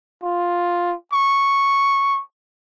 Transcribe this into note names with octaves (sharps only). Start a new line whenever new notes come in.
F4
C#6